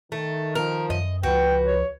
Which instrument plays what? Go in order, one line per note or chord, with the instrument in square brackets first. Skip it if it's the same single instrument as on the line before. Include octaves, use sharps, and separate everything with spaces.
[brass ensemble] D#3 [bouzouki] A3
[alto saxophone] F3 [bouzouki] A#4
[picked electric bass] F#2 [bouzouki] D#5
[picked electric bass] C#2 F3 [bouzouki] F#4 [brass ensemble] B4 [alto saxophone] G5
[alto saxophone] C#5